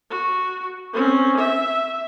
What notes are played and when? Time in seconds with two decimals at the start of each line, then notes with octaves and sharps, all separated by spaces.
0.10 F#4
0.93 C4 C#4
1.37 E5